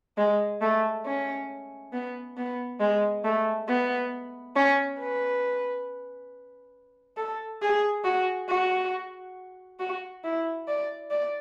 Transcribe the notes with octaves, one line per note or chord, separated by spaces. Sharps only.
G#3
A3
C#4
B3
B3
G#3
A3
B3
C#4
B4
A4
G#4
F#4
F#4
F#4
E4
D5
D5